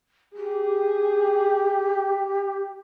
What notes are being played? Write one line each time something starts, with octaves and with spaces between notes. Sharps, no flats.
G4 G#4